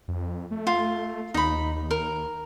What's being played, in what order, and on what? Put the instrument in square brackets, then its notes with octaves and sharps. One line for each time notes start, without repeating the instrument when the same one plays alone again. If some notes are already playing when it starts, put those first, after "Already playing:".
[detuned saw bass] F2
A3
[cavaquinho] F4
[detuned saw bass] D#2 [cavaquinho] D#4 B5
[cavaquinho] A#4